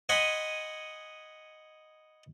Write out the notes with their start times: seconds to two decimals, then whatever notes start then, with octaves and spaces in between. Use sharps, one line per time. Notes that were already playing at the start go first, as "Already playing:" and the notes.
0.09 D#5 F#5 G#5 B5 C6